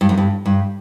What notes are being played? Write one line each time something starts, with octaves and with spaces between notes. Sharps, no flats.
G2
F#2
G2
G2